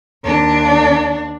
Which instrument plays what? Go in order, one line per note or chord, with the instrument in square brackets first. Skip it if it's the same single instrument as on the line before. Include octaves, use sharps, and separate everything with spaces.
[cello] D#2 D4